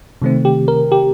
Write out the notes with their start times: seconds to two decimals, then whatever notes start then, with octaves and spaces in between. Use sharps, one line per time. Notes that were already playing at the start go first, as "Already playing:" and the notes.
0.22 C3 D#3 A3 C4
0.45 G4
0.68 A#4
0.92 G4